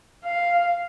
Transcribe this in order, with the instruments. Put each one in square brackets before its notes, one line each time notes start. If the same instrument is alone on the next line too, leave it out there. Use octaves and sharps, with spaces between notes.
[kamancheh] F5